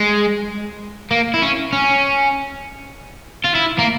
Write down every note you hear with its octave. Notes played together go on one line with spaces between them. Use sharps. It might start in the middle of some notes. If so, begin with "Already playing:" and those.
Already playing: G#3
A#3
E4
C#4
C#4
F4
E4
A#3